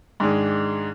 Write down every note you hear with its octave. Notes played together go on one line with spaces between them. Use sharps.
G#2 D#3 G#3 D4 G#4